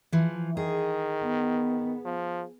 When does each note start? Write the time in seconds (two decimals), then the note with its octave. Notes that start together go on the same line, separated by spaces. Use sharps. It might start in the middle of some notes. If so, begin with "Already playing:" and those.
0.12 E3 F3
0.57 D#3 G#4
1.22 B3
2.05 F3